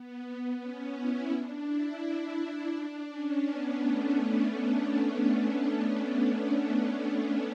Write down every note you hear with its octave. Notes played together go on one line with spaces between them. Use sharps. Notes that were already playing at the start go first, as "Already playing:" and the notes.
Already playing: B3
C#4
E4
D4
E4
D4
E4
D4
C#4
B3
A3